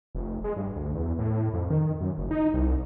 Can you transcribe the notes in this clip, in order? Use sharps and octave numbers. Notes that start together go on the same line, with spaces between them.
F1
G#3
G2
D2
E2
A2
F2
D#3
F#2
F#1
D#4
C2